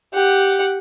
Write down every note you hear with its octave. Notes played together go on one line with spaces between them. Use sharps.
G4 F#5